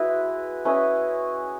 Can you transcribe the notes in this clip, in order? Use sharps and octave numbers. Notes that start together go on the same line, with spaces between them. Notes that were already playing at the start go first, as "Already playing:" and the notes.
Already playing: G#3 E4 F#4 B4 D#5
C#4 E4 B4 D#5